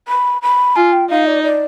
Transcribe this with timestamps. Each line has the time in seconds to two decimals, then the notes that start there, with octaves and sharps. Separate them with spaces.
0.08 B5
0.42 B5
0.75 F4 G#5
0.92 G5
1.10 D#4 F5
1.26 D5
1.44 D5